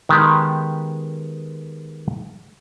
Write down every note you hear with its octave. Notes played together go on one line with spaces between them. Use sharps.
D#3 G#3 B3 G4